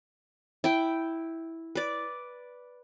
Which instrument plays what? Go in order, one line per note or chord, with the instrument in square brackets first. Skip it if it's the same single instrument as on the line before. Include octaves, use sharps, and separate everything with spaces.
[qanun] E4 G5
B4 D5